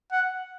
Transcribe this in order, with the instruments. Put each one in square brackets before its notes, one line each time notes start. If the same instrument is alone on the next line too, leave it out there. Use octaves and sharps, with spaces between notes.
[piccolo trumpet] F#5